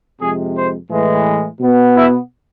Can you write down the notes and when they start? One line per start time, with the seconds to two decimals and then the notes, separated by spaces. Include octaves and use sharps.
0.20 F2 C3 G#3 G#4
0.55 C5
0.91 A2 E3 G#3
1.60 B2 B3
1.95 E4